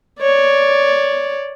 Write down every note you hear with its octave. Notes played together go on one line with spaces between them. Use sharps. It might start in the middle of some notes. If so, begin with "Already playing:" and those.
C#5 D5